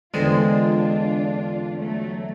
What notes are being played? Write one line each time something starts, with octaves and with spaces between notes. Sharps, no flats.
E2 D3 G#3 C4 D4 F4
F#3 A3